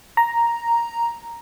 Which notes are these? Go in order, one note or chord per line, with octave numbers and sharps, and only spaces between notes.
A#5